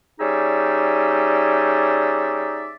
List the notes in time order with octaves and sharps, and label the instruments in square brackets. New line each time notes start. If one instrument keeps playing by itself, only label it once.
[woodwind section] G3 C#4 D#4 G#4 D5 E5